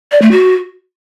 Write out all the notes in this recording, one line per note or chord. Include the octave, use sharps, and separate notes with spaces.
D5
A3
F#4